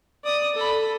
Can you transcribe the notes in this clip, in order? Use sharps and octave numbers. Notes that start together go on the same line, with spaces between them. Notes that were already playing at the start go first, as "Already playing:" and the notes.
D5 D#6
A4 B5